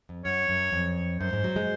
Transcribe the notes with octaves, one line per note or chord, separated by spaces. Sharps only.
F2
F#2 C#5
F#2
F2
F#2 C5
G#2
F#3
G#3